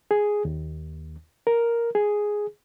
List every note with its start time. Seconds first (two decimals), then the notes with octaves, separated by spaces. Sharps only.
0.11 G#4
0.45 D#2
1.47 A#4
1.95 G#4